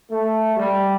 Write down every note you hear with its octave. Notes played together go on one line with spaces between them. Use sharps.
A3
G3